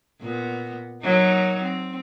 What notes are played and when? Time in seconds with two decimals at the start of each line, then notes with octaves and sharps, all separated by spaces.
0.21 A#2 B3
1.02 F#3 A#3 D#4
1.62 C4